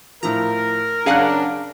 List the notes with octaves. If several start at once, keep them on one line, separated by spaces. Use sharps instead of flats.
A2 F3 A#4 A#5
F#2 C#3 D4 G#4 F5 F#5 F6 F#6